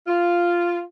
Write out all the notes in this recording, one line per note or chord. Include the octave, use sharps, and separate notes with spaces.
F4